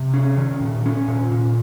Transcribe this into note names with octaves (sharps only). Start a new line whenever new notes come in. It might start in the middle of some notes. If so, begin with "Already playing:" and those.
Already playing: C3
C#4
D#3
A#2
C#4
A#2
A#2